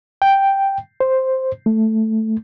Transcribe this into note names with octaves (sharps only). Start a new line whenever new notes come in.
G5
C5
A3